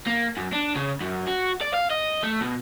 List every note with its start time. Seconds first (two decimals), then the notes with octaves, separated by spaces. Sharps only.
0.07 A#3
0.37 F#2
0.53 D4
0.75 C#3
1.01 F#2
1.27 F#4
1.61 D5
1.74 F5
1.90 D#5
2.23 A3
2.42 B2